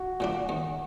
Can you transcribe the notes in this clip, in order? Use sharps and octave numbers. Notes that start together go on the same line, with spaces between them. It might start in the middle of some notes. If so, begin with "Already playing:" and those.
Already playing: F#4
A#2 G3 D4
D#2